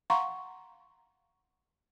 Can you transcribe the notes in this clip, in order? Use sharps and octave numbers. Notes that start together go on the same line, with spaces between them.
F5 F#5 A#5 C6 C#6